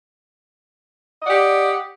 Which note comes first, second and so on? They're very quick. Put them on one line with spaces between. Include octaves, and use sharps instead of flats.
D#5 F#5 D5 G4